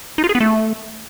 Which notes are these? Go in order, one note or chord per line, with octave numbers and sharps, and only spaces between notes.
D#4
F4
G#4
B3
A3